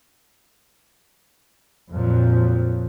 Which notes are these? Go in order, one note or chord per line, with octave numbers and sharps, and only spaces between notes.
F2 A#2 F3 F#3